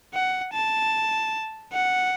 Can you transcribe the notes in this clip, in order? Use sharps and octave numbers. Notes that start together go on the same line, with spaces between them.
F#5
A5
F#5